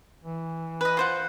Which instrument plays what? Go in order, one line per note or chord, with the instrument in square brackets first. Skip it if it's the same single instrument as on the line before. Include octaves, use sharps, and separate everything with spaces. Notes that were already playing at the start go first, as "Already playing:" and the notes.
[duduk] E3
[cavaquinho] B4 D#5
F4 C5 F#5